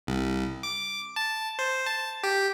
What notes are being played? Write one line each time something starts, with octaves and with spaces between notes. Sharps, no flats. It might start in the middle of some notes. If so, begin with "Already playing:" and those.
C2
D6
A5
C5
A5
G4